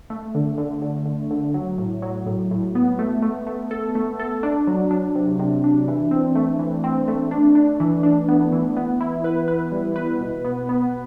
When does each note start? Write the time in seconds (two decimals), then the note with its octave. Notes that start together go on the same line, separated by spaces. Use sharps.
0.10 A3
0.35 D3
0.58 D3
0.82 D3
1.06 D3
1.31 D3
1.54 F#3
1.78 A2
2.02 F#3
2.26 A2
2.51 A2
2.75 B3
2.99 A3
3.22 A3
3.47 A3
3.71 A4
3.95 A3
4.20 A4
4.43 D4
4.67 F#3
4.91 D4
5.15 C3
5.39 C3
5.64 D4
5.88 E3
6.11 C4
6.35 A3
6.59 E3
6.84 C4
7.08 A3
7.31 D4
7.55 D4
7.80 E3
8.03 D4
8.29 B3
8.52 E3
8.77 B3
9.01 E4
9.24 B4
9.48 B4
9.72 G3
9.96 B4
10.21 B2
10.44 B3
10.69 B3